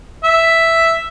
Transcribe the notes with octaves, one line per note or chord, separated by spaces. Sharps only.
E5